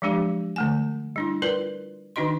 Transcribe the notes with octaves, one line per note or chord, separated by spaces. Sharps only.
F3 F#3 G#3 D4 G4
D3 A3 G#5
G3 D4 E4
F4 A#4 B4 D5
D#3 D4 D#4 F#4 D#5 C6